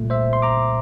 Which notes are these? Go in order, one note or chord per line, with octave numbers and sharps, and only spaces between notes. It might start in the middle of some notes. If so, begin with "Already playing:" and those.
Already playing: C2 A#2 A3
C5 E5
C6
A#5 D6